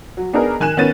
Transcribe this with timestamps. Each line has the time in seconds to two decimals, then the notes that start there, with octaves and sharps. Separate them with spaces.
0.17 F#3
0.33 B3 D4 D#4 G#4 A#4
0.60 D#3 G#5 F#6 E7
0.77 D#3 B3 C#4 A6 D#7